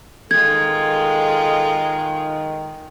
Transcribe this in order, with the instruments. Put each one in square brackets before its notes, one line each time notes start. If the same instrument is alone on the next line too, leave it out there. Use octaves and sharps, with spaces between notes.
[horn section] D#3 [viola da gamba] G#3 F4 [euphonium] A4 [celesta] G#6